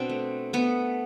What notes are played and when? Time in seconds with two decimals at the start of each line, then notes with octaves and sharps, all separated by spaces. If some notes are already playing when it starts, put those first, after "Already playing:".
Already playing: B2 C4 D4
0.09 A3
0.53 A3 B3